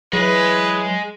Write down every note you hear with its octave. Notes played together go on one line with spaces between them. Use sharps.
E3 F#3 G#3 E4 G#4 B4